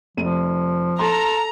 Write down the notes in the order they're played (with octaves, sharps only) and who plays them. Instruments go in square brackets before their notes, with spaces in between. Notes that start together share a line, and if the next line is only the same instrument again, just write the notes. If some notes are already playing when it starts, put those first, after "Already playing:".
[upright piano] F1 D#7 [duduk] F3
[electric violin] A4 [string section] A#5 [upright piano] C6